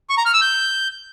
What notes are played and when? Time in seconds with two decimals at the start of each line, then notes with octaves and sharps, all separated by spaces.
0.10 C#6
0.18 A#5
0.26 F6
0.34 E6
0.42 G6